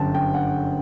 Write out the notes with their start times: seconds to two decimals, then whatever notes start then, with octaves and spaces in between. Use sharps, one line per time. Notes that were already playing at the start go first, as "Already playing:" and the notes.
Already playing: G1 F#2 D3 G5 A5
0.15 G5
0.34 F#5